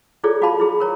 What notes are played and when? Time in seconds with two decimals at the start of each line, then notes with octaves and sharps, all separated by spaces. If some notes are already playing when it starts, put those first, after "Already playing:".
0.24 E4 F4 G#4 A4 C#5 D5
0.42 F4 F#4 G#4 F5 A5 B5
0.60 E4 G#4
0.80 A#4 C#5 A#5